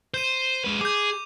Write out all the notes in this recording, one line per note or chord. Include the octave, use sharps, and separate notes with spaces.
C5 G6 D#7
G#3 B4
G#4 D6 G6